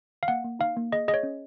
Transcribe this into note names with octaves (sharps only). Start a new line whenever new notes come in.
F5
A#3 F#5
A#3
D#4 F5
A#3
G#4 D#5
G#4 D#5
C#5
C#4